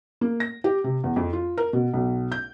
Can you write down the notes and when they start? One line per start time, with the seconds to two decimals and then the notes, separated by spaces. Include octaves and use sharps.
0.21 A#3
0.40 A#6
0.64 G4
0.84 C3
1.04 E2
1.16 F2
1.33 F4
1.58 A#4
1.73 B2
1.93 B1
2.32 G6